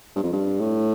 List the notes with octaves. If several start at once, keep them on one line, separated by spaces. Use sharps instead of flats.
G2
F2
G2
A2